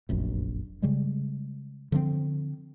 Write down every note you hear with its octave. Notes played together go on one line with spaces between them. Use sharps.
F1 A#1 F#2
C#3 G3 G#3
D3 F3 A3 C4